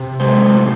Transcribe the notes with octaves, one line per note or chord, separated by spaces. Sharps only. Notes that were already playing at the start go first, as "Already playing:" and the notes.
Already playing: C3
G#3 C5
A2